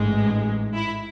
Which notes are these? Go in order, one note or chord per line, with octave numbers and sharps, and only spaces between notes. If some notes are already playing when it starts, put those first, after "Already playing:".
Already playing: A1 G#2 G#3
E4